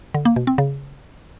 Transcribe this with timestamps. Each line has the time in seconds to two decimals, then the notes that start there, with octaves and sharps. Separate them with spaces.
0.14 D3
0.25 A#3
0.36 B2
0.47 C4
0.58 C#3